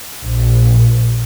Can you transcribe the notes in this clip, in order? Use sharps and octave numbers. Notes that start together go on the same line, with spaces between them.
A#1